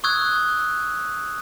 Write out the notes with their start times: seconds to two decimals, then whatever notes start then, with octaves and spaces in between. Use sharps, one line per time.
0.04 C#6 D#6 E6 F#6 G#6